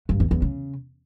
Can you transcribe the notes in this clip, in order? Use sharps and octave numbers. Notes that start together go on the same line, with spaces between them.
G2
E2
E2
C#3